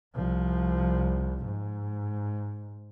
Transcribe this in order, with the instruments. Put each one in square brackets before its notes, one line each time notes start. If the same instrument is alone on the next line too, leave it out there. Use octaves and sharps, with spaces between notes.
[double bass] C2 F3
G#2